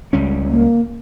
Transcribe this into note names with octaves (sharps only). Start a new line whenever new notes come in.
C#2 G3 C#4
A#3